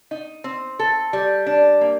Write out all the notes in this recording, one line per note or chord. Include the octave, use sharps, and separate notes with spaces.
D#4
C4
A4
G3
D4
A#3